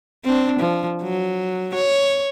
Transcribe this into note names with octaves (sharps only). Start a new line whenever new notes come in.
C4 D4
F3
F#3
C#5